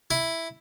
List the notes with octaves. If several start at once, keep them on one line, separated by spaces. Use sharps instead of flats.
E4